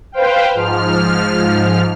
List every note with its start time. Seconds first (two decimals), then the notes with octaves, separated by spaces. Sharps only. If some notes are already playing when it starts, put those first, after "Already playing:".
0.12 B4 C5 F5 G5
0.54 G#2 F3 F6